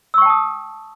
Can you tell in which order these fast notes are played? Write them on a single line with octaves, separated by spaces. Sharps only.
E6 C#6 G5 A5 D#6